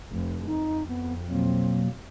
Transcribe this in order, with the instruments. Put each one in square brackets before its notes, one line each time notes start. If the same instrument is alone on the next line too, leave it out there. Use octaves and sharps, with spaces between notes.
[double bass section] F1
[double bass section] F2 [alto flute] D#4
[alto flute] B3
[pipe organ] B2 F#3 A#3 [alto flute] C4